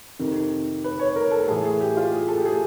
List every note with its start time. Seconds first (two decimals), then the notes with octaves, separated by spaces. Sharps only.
0.19 F2 C3 D#3
0.84 B4
0.99 C#5
1.16 A#4
1.31 A4
1.44 A4
1.47 A2 E3 G#4
1.65 G#4
1.80 G4
1.97 F4
2.12 G#4
2.28 A4
2.38 G4
2.45 G#4